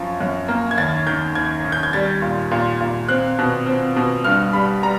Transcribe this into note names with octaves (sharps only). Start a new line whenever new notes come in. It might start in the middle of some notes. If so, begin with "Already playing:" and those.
Already playing: F#2 F3
F#2
A#3
G#6
D#2 A6
D#3 G6
D#2 G#6
D#3
G6
G#6
G3 A6
A#2
A#2
A#2
C4 F#6
B2
C4
B2
G2 F6
G3 B5
G3 A#5